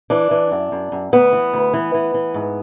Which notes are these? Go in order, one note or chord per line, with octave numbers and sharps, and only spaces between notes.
E3 D4
E3
F#2
F#2
F#2
D2 B3
E3
D2
E3
E3
E3
G#2